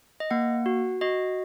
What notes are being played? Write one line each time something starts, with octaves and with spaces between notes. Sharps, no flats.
D#5
A#3 F#5
F#4
F#4 D#5